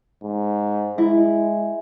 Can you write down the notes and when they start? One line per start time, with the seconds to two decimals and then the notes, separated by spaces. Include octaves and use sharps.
0.23 G#2
0.98 G#3 E4